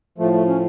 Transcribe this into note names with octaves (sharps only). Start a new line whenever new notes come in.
A2 F3 A3
A3
C#4